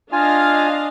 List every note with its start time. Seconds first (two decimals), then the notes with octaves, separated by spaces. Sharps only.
0.12 D4 F4 D#5 F5 G#5